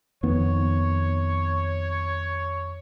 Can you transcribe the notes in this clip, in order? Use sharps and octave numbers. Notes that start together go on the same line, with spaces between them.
F2 D#3 B3 C#5